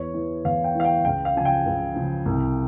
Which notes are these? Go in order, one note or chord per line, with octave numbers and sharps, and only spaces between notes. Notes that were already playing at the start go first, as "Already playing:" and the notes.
Already playing: E2 C#5
E3
E2 F5
G5
E3 F5
G5
C#2 G5
F5
C#3 F3 G#5
G5
C#2
C#3 F3
C2